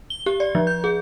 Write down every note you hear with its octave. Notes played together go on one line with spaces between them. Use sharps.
G7
G4
D5
F3
G6
G#4